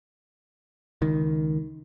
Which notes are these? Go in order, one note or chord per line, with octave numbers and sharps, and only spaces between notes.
C#2 D#3